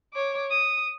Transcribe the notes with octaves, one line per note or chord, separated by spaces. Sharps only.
C#5 D6
D#6